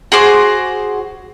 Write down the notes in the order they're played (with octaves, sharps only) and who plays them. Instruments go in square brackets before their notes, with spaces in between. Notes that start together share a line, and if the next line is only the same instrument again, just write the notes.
[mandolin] F#4 G#4 C5 D6